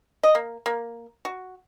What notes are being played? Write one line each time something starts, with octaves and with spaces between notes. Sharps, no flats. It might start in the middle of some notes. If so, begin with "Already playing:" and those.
D#5
A#3
A#3
F#4